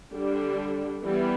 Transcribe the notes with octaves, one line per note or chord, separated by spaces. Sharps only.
D3 G3 D4
E3 G3 B3